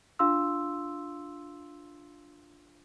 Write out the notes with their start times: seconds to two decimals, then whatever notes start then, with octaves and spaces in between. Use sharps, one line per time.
0.19 D4 F4 F5 C6 E6